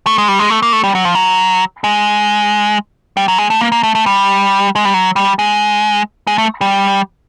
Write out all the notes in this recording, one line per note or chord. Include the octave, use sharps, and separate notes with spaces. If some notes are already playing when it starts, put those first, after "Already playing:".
A3
G#3
G3
G#3
A3
A#3
A3
G3
F#3
F3
F#3
G#3
G3
F#3
G#3
A3
A#3
A#3
A3
A3
G3
G#3
G3
F#3
G3
G#3
G#3
A3
G3